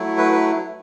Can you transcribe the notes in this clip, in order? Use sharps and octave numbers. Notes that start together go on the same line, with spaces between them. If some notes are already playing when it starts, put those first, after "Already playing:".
Already playing: F#3 A3 E4
B4
B4